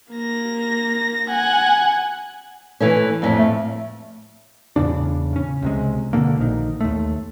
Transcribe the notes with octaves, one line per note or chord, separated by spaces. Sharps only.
A#3 A#6
F#5 G#5
E3 A3 C#4
F2 A2 C#4
A3
E2 A2 C#3 D4
C#3 C#4
C#2 C3 G#3
B2 D3 A#3
A#1 D#3
D#2 A3